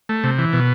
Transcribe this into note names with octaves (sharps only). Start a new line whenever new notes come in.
A3
C3
E3
B2